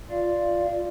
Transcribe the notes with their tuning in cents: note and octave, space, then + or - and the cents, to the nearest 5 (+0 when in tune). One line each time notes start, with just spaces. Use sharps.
F4 +0 D5 +0 F5 -20